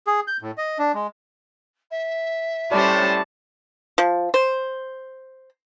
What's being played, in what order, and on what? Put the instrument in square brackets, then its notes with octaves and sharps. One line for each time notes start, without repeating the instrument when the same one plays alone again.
[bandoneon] G#4
G6
A2
D#5
D4
G#3
[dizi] E5
[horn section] A2 A5 [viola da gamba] G3 C#4 C5 [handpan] D5
[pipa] F3
C5